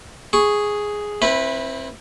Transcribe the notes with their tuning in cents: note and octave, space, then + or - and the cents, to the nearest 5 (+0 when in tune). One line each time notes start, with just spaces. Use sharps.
G#4 +0 C#6 +0
C4 +25 E4 +0 B4 -10